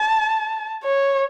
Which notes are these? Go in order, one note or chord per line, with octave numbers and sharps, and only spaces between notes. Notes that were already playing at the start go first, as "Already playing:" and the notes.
Already playing: A5
C#5